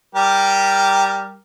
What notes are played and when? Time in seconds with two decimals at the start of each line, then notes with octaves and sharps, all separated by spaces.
0.15 G3 G4 A#4